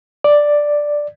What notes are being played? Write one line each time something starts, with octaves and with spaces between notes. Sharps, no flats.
D5